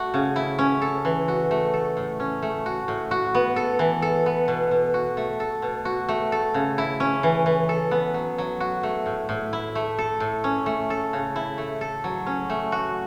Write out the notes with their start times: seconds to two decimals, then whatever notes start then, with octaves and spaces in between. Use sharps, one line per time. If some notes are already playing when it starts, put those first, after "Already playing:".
Already playing: A3 F#4
0.14 C#3
0.36 E4
0.59 C#4
0.82 A4
1.05 E3
1.28 F#4
1.51 A3
1.74 A4
1.97 A2
2.20 C#4
2.42 A3
2.66 F#4
2.88 A2
3.11 F#4
3.35 B3
3.56 A4
3.79 E3
4.02 A4
4.26 B3
4.48 B2
4.71 B2
4.94 F#4
5.17 A3
5.40 A4
5.62 B2
5.85 F#4
6.09 A3
6.32 A4
6.54 C#3
6.78 E4
7.00 C#4
7.23 E3
7.46 E3
7.69 A4
7.91 B3
8.14 F#3
8.38 F#3
8.60 F#4
8.83 A3
9.06 A2
9.29 A2
9.53 E4
9.75 A3
9.98 A4
10.20 A2
10.44 C#4
10.66 A3
10.90 A4
11.13 C#3
11.36 E4
11.58 A3
11.81 A4
12.04 F#3
12.26 C#4
12.50 A3
12.72 F#4